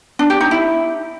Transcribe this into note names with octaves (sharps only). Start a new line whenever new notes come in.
D4
G4
D#4
E4